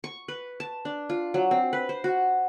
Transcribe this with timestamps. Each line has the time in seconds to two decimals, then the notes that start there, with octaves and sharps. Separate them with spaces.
0.04 C#6
0.28 B4
0.60 A5
0.85 D4
1.10 F4
1.34 F#3
1.51 C4
1.73 B4
1.89 C5
2.04 F#4